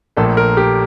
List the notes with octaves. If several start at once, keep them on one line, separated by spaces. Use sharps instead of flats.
A#1 A#2 A3 A4
A#4
G4